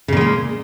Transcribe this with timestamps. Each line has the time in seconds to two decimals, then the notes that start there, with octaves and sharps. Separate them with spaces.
0.08 C#3
0.12 A#2
0.17 G#3
0.21 A#3